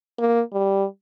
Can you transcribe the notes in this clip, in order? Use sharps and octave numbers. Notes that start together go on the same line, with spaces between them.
A#3
G3